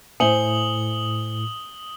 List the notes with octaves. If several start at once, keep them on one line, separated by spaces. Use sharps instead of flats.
A2 C5 E5 G#5 D#6 C#7 F#7 G7